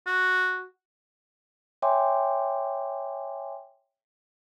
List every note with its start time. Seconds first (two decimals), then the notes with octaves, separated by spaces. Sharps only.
0.06 F#4
1.82 C#5 E5 G5 G#5 C6 D6